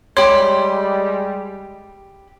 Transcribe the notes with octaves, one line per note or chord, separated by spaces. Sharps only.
G3 G#3 G4 C#5 B5 C6